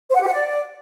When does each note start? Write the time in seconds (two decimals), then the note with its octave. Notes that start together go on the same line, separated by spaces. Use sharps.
0.10 C5
0.16 F#5
0.22 G4
0.27 F#5
0.33 D5